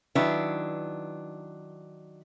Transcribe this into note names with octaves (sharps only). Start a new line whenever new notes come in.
D#3 F#3 D4 E4 B4